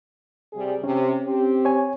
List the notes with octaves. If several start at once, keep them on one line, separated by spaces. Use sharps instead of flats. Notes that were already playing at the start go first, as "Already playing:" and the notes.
C3 G3 G#4
C3 C#4
C4 G4
C#5 G#5